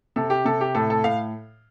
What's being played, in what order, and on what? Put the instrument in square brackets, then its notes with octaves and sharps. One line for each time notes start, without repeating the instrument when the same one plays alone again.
[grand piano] C3 A4
G4
C3 A4
G4
A2 A4
A4
A2 F5